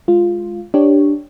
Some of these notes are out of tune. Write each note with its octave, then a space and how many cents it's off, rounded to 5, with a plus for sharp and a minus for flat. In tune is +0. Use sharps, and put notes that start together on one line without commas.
G#3 +0 F4 +0
D4 +0 G4 +0 C#5 +0